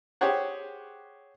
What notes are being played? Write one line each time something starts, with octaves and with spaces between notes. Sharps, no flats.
G4 G#4 C5 C#5 F#5